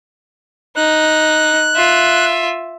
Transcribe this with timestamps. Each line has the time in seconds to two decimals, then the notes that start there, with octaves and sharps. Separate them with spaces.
0.77 D#4 F#6
1.76 F4 E5